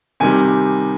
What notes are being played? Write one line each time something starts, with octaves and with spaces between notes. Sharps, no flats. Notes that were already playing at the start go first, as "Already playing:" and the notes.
C3 D#3 G3 G#5